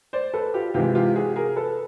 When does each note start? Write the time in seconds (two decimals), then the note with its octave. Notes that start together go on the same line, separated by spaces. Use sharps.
0.13 C5 D5
0.34 A4 B4
0.54 F4 G4
0.74 C3 E3 G#3 F4 G4
0.95 F4 G4
1.15 F#4 G#4
1.36 G#4 A#4
1.56 A4 B4